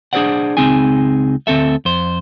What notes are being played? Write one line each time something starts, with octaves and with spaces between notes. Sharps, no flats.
D4 G#4 A4 C5 D5 F#5
C#2 C4 D#4 G#4 G#5
D2 C4 A4 E5
F2 C5